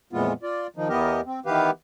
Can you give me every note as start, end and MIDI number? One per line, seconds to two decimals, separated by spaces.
0.13 0.33 41
0.13 0.33 46
0.13 0.33 52
0.13 0.33 56
0.13 0.33 59
0.13 0.33 65
0.43 0.67 65
0.43 0.67 74
0.76 0.88 51
0.76 0.88 53
0.76 0.88 63
0.89 1.21 40
0.89 1.21 52
0.89 1.21 59
0.89 1.21 67
0.89 1.21 70
0.89 1.21 75
1.26 1.39 60
1.46 1.70 51
1.46 1.70 52
1.46 1.70 59
1.46 1.70 67
1.46 1.70 71
1.46 1.70 77